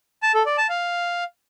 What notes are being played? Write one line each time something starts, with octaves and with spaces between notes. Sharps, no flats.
A5
A4
D5
A5
F5